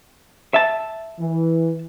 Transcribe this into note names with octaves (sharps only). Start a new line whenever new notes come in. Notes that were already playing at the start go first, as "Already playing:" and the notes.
E5 A5
E3